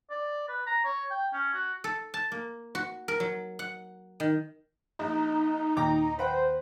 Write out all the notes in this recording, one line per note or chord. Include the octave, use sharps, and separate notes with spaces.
D5
B4
A#5
C#5
G5
C#4
F#4
A4
A5
A#3
F#4
A#4
F#3
F#5
D#3
A#1 D#4
D#2 A#2 G5 A#5 D6 A#6
B4 C5 F#5 G5